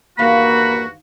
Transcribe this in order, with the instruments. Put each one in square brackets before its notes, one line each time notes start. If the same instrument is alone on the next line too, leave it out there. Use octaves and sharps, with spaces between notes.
[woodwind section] E2 G2 F#4 [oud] D#3 C5 F5 [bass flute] A#3 [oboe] B5